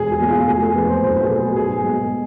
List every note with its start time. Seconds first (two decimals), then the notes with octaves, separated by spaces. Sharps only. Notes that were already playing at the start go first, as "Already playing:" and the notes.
Already playing: E1 G#4
0.12 G#4
0.21 E2 B2 A3
0.29 F4
0.47 F1 G#4
0.61 A4
0.75 E2 C3 F3 B4
0.89 C5
1.02 B1 C5
1.15 B4
1.24 G#4
1.29 B2 A3 A4
1.43 G#4
1.56 B1 G#4
1.83 B2 G#3